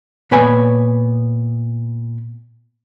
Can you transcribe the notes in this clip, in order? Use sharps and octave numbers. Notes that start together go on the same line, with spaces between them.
A#2 B3 B4 C#5 G#5 B5